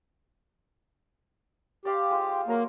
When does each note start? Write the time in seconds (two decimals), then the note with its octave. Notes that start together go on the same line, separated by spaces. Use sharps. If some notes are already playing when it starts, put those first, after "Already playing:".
1.85 G4 D5 F5 C6
2.11 G#3 F4 C5
2.48 F#3 A#3 A#4 C6